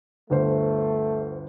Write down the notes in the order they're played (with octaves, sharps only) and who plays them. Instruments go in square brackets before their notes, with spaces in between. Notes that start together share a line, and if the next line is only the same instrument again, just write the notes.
[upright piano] G1 D2 C5 [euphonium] A3